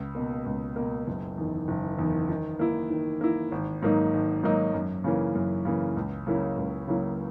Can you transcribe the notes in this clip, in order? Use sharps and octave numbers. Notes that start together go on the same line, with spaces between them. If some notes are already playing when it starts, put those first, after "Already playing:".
Already playing: C#2
B2 A#3
C#2
B2 A#3
F#1
E2 D#3
F#1
E2 D#3
D#3
A#3 E4
D#3
A#3 E4
G#1
G#2 F#3 A#3 D#4
G#1
G#2 F#3 A#3 D#4
F#2
C#3 E3 A#3
F#2
C#3 E3 A#3
C#2
C#3 F#3 A#3 E4
C#2
C#3 F#3 A#3 E4